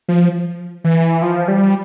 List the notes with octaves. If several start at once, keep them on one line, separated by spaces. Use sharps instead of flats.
F3
E3
F3
G3